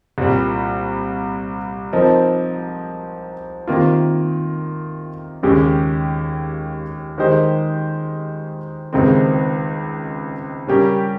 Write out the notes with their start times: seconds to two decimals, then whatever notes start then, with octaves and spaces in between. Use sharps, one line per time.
0.18 C2 A#2 G3
1.93 F3 C4 D#4 A#4
3.67 C3 D#3 A#3 F4
5.43 D#2 C#3 G#3 C#4 G4
7.18 D#3 G#3 D#4 G4 C5
8.93 C#2 C3 D#3 G#3 C4
10.67 C#3 G3 C#4 G4 A#4